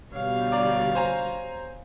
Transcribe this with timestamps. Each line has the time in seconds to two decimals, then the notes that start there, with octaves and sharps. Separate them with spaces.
0.12 B2 D3 G3 C#5 F5
0.52 D5 A#5 D6
0.95 C5 G#5 A#5